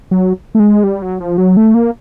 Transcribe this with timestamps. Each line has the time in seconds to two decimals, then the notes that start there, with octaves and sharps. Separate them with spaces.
0.11 F#3
0.55 A3
0.60 G#3
0.84 G3
1.02 F#3
1.20 F3
1.38 F#3
1.57 A3
1.74 A#3